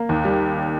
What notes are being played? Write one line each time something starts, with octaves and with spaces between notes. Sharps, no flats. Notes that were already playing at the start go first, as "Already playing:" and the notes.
Already playing: A#3
D#2
G3